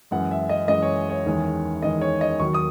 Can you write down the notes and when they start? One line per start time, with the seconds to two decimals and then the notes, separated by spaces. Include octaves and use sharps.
0.11 F#2 E3 G#3 F#5
0.31 E5
0.49 D#5
0.68 F#2 E3 G#3 D#5
0.83 C#5
1.10 C#5
1.26 E2 D#3 G#3
1.83 E2 D#3 G#3 D#5
2.01 C#5
2.21 D#5
2.40 D#2 D#3 F#3 C#6
2.54 D#6